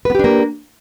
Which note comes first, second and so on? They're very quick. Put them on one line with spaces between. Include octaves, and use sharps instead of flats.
B4 B3 G4 D4 A#3